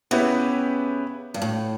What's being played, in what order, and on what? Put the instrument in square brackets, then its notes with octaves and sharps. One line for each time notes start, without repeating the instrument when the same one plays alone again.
[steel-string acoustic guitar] C#3 [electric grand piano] B3 E4 G4 B4
[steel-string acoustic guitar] G2
A2